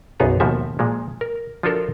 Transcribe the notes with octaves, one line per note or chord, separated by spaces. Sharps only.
B1 F#2 B3 D#4 G#4 A#5
D#2 G#2 B2 F3 F#4 E5
A#2 F3 G#3
A#4
F3 D4 F4 F#4 A4 A#4